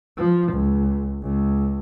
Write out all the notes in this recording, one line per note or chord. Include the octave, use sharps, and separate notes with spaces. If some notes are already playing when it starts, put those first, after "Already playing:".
F3
C#2
C#2